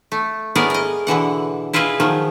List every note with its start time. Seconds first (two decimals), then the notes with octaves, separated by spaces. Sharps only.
0.12 A3
0.55 A2 B3 G#4 A#4 D5
0.70 A#4 D#5
1.07 B2 D3 E3 F#5
1.73 E4 F4 G#4 B4 D#5
2.00 D#3 F3 F#3